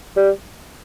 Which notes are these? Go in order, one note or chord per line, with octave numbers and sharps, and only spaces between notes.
G3